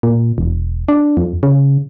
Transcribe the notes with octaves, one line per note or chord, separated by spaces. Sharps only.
A#2
E1
D4
F2
C#3